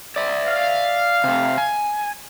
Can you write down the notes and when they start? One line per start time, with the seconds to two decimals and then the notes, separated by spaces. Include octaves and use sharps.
0.16 D5 E5
0.47 F5
1.24 C3 A3
1.58 G#5